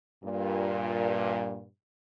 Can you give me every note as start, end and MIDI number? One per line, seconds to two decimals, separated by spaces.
0.23 1.66 43
0.23 1.66 46